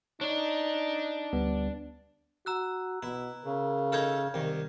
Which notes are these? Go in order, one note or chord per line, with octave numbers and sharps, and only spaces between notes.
D4 D#4 C#5 D5
D2 G3 B3
F#4 A#5 E6 F#6
B2 E4
C#3 A#4
D#4 E4 A4 F6 G6 G#6
C2 D#3